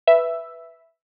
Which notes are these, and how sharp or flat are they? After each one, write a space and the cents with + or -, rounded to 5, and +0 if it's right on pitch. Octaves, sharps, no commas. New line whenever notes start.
B4 +0 E5 +0